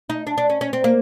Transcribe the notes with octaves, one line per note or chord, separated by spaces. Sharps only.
D#4
D4
D4
C#4
C#4
C4
A#3